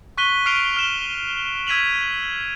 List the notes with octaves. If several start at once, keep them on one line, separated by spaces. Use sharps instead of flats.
C#6 F#6 B6 D#7 G7
C#6 F6 C7 D7 F7
F6 E7 G7
E6 G#6 B6 D#7 F7 F#7